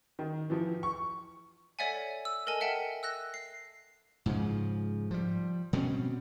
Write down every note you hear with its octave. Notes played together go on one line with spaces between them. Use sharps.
D#3
E3 F3
C#6
A4 C#5 D5 E5 F#5 G#5
E6
A4 A#4 D#5 G#5 A5
A#4 E5 F#5 G5 A5
E6 F#6 A#6
C7
G#2 C#3 F3
F3 G3
B2 G3 C4 C#4